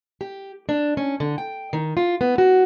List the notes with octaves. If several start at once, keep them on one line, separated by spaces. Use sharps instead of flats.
G4
D4
C#4
D3
G5
D#3
F4
B3
F#4